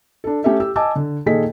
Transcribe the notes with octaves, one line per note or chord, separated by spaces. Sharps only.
D4 A4
A3 C#4 G4 A4 E5
G4 E6
D#5 G#5 A5 D6 E6
D3
A#2 D#3 G#4 A4 D#5 B6